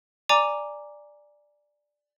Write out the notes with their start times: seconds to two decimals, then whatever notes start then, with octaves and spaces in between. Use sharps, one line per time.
0.29 D5 G#5 A#5 D6